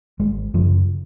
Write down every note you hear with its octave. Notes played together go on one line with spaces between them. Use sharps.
G#1 G#3
F#2 C#3 F3